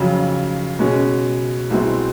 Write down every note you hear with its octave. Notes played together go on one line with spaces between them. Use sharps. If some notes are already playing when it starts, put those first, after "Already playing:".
Already playing: F2 C#3 F#3
B2 G#3 C#4
C2 B2 G#3 C4 E4